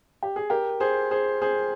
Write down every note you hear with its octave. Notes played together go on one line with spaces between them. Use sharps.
G4
G#4
G4 A#4
G#4 C5
G#4 C5
G#4 C5